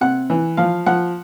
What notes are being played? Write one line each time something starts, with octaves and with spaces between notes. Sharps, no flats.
C3 F#5
E3
F3 F5
F3 F#5